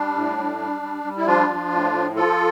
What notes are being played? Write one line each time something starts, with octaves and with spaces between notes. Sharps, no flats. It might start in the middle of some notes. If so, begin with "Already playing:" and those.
Already playing: G3 D4
A2
G3
G3
G3
G3
E4
F3 D4 F4
F3
A2
F3
F3 F4 A4